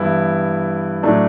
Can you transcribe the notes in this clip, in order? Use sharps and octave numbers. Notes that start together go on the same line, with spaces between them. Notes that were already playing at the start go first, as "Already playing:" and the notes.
Already playing: G2 E3 B3 E4
A2 F#3 A3 D4